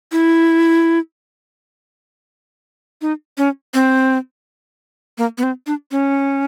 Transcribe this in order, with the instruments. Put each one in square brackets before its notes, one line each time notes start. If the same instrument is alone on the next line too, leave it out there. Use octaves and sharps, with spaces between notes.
[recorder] E4
D#4
C#4
C4
A#3
B3
C4
D4
C#4